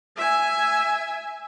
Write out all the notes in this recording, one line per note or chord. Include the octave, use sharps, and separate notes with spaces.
E5 G#5